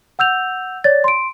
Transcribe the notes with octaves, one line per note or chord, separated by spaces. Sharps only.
F#5 E6 G6 F7
C#5 D5 A6
C6 D7